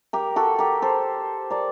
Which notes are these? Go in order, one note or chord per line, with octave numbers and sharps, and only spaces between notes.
G4 A#4
F#4 A4
G4 A#4
A4 C5
A#4 D5